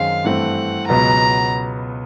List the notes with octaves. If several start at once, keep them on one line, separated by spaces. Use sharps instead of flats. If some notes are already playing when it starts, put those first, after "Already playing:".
Already playing: F#2 D#3 G#3 C4 F5
G2 E3 A3 C4 F#5
C#2 B2 F#3 B3 A#5